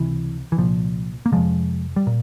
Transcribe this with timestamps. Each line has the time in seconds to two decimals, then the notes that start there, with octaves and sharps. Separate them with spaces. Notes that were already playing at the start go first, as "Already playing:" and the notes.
Already playing: C#2 C3 E3
0.52 E3
0.57 C2 A#2 F3
1.26 A#3
1.32 F2 C3 F3 G#3
1.96 G3
2.07 A#2